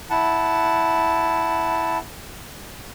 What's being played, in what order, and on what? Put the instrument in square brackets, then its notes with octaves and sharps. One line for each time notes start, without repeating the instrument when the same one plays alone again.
[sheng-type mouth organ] E4 F#5 A5